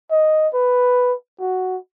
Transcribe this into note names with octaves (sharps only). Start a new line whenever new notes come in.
D#5
B4
F#4